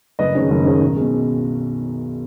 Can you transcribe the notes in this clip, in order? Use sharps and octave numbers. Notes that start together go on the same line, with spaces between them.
F#1 B4 D#5
F#2 D#3 G#3 C#4
F#1
F#2 D#3 G#3 C#4
B1
B2 G#3